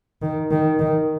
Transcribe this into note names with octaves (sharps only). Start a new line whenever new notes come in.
D#3
D#3
D#3